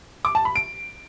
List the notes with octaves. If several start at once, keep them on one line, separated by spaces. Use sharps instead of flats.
D6
A5
B5
D7